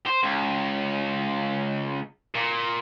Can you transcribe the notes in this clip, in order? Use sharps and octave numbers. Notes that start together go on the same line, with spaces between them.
C5
C#2
A#2